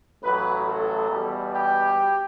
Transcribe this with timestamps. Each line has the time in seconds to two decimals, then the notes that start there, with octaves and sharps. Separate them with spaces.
0.22 A1 A2 F#3 B4
0.66 A4
1.10 E2 B2 G3
1.54 G4